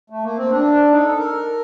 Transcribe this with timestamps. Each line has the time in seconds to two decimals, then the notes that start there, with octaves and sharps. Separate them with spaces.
0.10 A3
0.24 A#3
0.37 C4
0.50 D4
0.91 D#4
1.04 A4
1.19 A#4